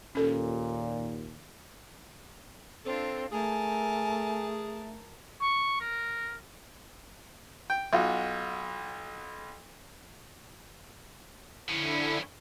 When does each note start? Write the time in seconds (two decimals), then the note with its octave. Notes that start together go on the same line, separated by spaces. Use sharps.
0.15 D#2 A#2 C#4 A4
2.85 C4 D4 F4 A4
3.32 A3 G#4 A#4 G#5 A5
5.41 C#6
5.80 A#4
7.70 G5
7.93 B1 F4 F#4
11.69 D3 F3 C#4 E4